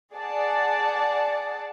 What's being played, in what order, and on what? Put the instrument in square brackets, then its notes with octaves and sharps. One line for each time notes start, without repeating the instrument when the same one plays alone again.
[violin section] G#4 D5 F#5 A5